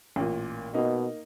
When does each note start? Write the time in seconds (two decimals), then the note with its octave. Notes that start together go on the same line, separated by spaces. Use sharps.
0.16 A1 A#2
0.74 B2 A#3 D#4